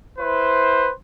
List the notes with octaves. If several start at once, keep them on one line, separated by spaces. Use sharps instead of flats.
E4 B4 C5